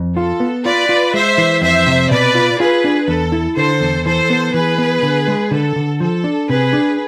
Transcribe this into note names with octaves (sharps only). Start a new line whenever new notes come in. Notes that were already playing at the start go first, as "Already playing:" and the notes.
Already playing: F2
F4 A4
B3
F4 B4 D5
F4
G#3 C5 E5
E3
F2 C5 E5
C3
B2 B4 D5
F4
F4 G#4 B4
D4
E2 A4
E4
D3 A4 C5
E2
E3 A4 C5
B3
E3 G#4 B4
B3
D3
G#3
D3 A4
D3
F3 A4
D4
C3 G#4 B4
D4